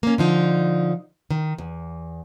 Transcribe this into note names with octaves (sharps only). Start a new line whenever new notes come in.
A#3 C#4
D3 F3 D#4
D#3
E2